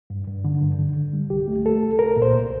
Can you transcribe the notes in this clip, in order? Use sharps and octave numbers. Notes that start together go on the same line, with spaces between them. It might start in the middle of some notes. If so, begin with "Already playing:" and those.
G2
G2
D3
G2
D3
D3
G3
C2 G4
A3
A3 A4
C2
C2 A#4
A#2
C5
C2